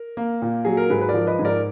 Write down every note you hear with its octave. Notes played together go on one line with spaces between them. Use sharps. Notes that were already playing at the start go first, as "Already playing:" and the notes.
Already playing: A#4
A#3
A#2
F#3 G#4
A#4
G#2 G#4 B4
B4
A#4 D5
F3
B4 D#5
G#2
A#4 D5